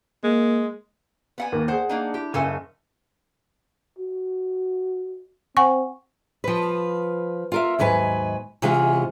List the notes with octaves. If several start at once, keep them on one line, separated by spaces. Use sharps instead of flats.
G#3 A#3
B3 F#5 G#5
D#2 A#3
G#4 C5 F#5
A#3 D4 D#4
E4 G4
F#1 C#3 A4 E5 G#5
F#4
C4 F#5 G#5 C#6
F3 B4
F4 A#4 E5
D#2 G#2 F#3 B4 G#5
C3 E3 G#3 C#4 F4 F#5